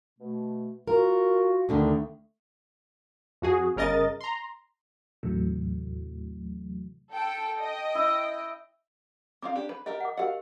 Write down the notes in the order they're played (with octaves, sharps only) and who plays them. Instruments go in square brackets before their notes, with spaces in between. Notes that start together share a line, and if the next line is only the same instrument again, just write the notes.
[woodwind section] B2 A3
[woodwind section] F4 F#4 [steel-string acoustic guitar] A#4
[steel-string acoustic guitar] D2 D3 D#3 [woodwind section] A3
[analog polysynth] F2 F#4 G#4
G1 C#3 A#4 D#5 A6
A#5 C6
[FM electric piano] D#2 A2 C3 E3 F#3 A3
[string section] A4 G5
D#5 G5
[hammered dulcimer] E4
[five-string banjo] C4 F4 F5 [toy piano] D6
[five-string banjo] D4 G4
B4
[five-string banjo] G4 A#4 [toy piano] D#5
[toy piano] F#5 D6
[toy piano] G4 A#4 D#5 [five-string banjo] F5 F#5